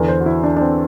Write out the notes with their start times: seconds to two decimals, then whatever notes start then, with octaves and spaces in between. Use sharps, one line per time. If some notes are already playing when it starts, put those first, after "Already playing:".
Already playing: E2 D3 B4
0.08 C5
0.20 F#4
0.26 E4
0.44 D4
0.57 D4
0.61 C4